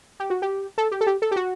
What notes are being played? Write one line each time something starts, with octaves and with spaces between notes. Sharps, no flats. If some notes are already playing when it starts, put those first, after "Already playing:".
G4
F#4
G4
A4
G4
A4
G4
A4
G4
F#4